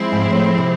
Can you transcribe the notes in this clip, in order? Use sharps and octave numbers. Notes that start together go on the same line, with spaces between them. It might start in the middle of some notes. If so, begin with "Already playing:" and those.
Already playing: F3 G#3 C4 E4
G#2
A2
C3